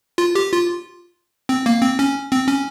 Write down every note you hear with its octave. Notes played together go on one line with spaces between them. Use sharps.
F4
G4
F4
C4
A#3
C4
C#4
C4
C#4